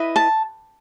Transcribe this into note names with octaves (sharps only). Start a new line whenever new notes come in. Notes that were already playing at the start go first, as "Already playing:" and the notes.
Already playing: E4 B4 D#5
A5